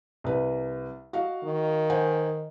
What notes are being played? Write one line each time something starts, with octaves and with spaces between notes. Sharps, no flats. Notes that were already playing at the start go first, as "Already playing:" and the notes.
C2 B4
F#4 D#5 F5
D#3
C5 F#5 G#5